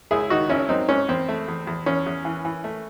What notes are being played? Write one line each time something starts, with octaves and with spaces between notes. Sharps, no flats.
C#2 E4 G#4
D#3 D#4 F#4
G#1 C#4 E4
F#3 C4 D#4
G#2 C#4
E2 C4
A3
E2
E2
E2 C#4
E2
E3
E3
A3